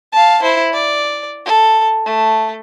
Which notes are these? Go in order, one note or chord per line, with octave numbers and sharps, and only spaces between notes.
F5 A5
E4 C5
D5
A4
A3